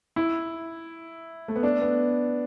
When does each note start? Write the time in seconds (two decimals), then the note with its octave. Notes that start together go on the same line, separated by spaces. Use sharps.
0.16 E4
1.48 A3
1.56 B3
1.63 D4
1.82 B3